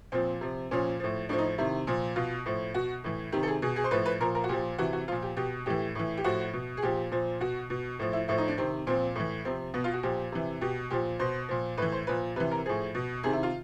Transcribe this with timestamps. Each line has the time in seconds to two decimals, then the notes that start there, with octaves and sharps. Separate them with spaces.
0.12 A#2 F3 C4
0.41 C3 F3
0.71 A#2 F3 C#4
1.00 A2 F3
1.29 A2 F3 D4
1.38 D#4
1.58 C3 D#3 E4
1.87 A#2 F3
2.16 B2 F4
2.46 A2 F3
2.74 B2 F#4
3.04 A2 E3
3.32 C3 D#3 G4
3.43 A4
3.48 G#4
3.62 B2 G#4
3.76 G#4
3.84 C5
3.91 A2 F3 B4
4.06 B4
4.20 A#2 F3 A#4
4.35 A#4
4.44 F#4
4.49 A#2 F3 G4
4.78 C3 E3 F#4
4.93 F#4
5.08 F3 F4
5.12 A#2
5.22 G4
5.37 B2 G4
5.66 A2 E3 G4
5.95 A2 E3
6.17 G4
6.24 A2 F3 F#4
6.53 B2
6.77 G#4
6.83 A#2 F3 G4
7.11 A#2 F3
7.40 B2 F#4
7.70 B2
7.99 A2 F3
8.13 E4
8.28 A2 F3 E4
8.38 D#4
8.48 D4
8.57 C3 D#3 C4
8.87 A#2 F3 C4
9.15 A2 E3
9.45 C3 F3 C4
9.74 B2 B3
9.84 F4
9.94 F#4
10.03 A#2 F3 G4
10.32 C3 E3
10.61 B2 G4
10.90 A#2 F3 G4
11.19 B2 C5
11.49 A#2 F3
11.77 A2 B4
11.82 E3
11.92 C5
12.07 A#2 F3 B4
12.36 C3 B4
12.40 E3
12.51 A#4
12.66 A2 F3 G#4
12.95 B2
13.23 C3 D#3 G#4
13.33 E4
13.43 F4